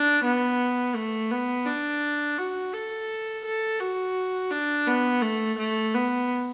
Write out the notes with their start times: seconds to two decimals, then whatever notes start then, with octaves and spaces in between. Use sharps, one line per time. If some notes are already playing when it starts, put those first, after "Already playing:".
Already playing: D4
0.25 B3
0.95 A3
1.31 B3
1.66 D4
2.38 F#4
2.73 A4
3.45 A4
3.80 F#4
4.51 D4
4.87 B3
5.22 A3
5.59 A3
5.94 B3